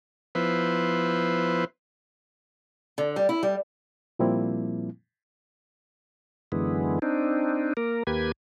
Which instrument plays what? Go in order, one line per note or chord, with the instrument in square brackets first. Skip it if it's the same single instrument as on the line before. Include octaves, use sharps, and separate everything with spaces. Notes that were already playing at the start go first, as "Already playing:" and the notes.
[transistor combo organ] F3 B3 E4 B4 C5
[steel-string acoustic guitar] D3
G3
E4
G3
[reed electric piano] A#2 F3 G3 A#3 C4 E4
[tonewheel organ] F#2 D3 E3 G#3 B3
C4 D4 D#4
A#3 A#4
D#2 A#3 G4 B4 G#6